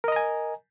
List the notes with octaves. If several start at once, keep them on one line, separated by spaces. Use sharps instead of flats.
A#4 D#5 G#5 A#5